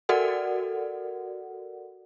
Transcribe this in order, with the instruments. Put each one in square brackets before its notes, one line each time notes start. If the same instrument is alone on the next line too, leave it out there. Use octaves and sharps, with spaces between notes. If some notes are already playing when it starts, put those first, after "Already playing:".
[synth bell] F#4 A4 A#4 D5 F#5